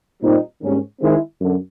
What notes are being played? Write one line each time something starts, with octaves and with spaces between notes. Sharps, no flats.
A#2 G3 C4 D#4
G#2 D#3 G3 A#3 C#4
D#3 G#3 C4 E4
F#2 D3